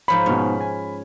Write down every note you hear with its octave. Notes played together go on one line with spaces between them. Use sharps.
G#2 F3 C#5 B5
G#2 B2 C#4
G#5